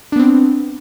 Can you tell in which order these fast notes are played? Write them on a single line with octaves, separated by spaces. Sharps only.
D4 B3 C4